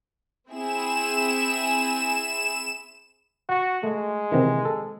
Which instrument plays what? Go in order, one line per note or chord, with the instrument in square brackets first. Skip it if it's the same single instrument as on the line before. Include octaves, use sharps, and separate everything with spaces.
[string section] C4 E4 G#4 [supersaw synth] E7
[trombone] F#4 [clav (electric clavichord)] F#5
[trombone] G#3 [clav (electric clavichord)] A3
[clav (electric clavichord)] C3 D#3 E3
A4